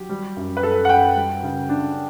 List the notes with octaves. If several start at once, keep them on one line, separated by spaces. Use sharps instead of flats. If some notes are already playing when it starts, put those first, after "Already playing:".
Already playing: F#3 G4
G3
F#2
B4
F#2 A4
F#5
F#2 G5
G3
C#3
D4